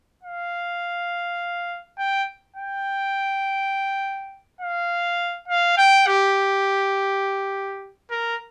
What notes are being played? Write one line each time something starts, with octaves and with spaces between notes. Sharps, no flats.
F5
G5
G5
F5
F5
G5
G4
A#4